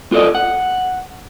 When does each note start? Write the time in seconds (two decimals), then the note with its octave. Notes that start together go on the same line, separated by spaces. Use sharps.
0.12 F4 A4 D5 D#5
0.35 F#5